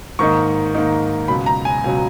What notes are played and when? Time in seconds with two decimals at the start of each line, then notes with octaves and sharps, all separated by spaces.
0.19 G#2 D#3 A#3 D#4 C#6
0.74 G#2 D#3 A#3 D#4
1.28 C#2 B2 F#3 B5
1.46 A#5
1.65 G#5
1.84 C#2 B2 F#3